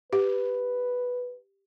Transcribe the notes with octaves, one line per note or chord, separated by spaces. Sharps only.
G4 B4